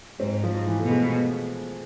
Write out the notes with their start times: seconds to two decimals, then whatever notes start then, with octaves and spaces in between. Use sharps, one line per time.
0.20 G#2 C4
0.44 F3
0.51 G#2
0.67 E3
0.79 B2 A3
0.91 G#3